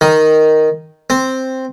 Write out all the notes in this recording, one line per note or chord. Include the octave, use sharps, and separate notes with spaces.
D#3
C4